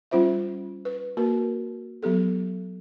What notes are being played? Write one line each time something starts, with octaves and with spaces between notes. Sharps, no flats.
G3 C#4 F4 C5 E5
B4
A#3 F#4 A#4
F#3 B3 G4 A4